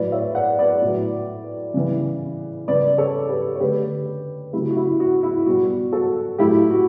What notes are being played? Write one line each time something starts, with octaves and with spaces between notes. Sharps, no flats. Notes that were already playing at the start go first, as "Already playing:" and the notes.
Already playing: A2 F#3 A3 B4 D5
C#5 E5
D5 F#5
B4 D5
A2 F#3 A3
C#3 E3 G3
C#3 G3 B4 D5
A4 C#5
G4 B4
C#5
D3 A3 G4 B4
C#3 F#3 A3 E4 G4
F#4
E4
F#4
E4
B2 G3 F#4
F#4 A4
A2 F#3 A3 E4 G4
F#4